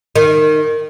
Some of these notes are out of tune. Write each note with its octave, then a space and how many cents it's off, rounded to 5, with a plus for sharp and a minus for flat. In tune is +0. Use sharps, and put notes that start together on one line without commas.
D#3 -15